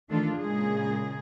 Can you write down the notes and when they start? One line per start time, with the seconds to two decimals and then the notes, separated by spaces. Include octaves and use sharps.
0.10 D#3 E3 A3 D4 F4 A4
0.38 A#2 C#3 G#3 G#4